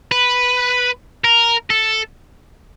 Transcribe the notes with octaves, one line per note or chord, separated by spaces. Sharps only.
B4
A#4
A4